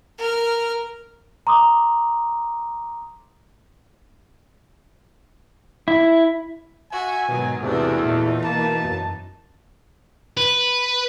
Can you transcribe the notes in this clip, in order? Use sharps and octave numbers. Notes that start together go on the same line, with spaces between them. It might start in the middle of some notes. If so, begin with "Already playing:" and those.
A#4 F6
A#5 C6 D6 D#6
E4
F#4 E5 G#5
G#2 B2 D#3 F#3
E2 C3 A3 D4 F#4
A#2 E3 D#4
B2 A#3 A5
F#2
B4